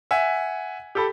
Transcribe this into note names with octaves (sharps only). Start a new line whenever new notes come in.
E5 F#5 G#5
G4 A4 B5